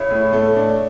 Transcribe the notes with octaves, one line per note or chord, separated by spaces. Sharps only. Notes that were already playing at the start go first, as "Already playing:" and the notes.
Already playing: C#3 E4
A2
A3
D4